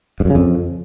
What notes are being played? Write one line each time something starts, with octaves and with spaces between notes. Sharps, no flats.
G2
F#2
C#3
F2